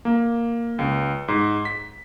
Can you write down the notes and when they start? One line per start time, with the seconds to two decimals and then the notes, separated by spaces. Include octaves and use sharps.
0.05 A#3
0.79 C#2
1.28 G#2
1.65 B6